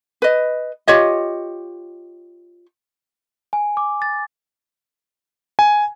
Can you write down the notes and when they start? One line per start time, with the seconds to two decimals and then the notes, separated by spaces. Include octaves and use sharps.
0.22 B4 D#5
0.88 F4 G4 C#5 D#5
3.53 G#5
3.77 D6
4.02 A6
5.59 G#5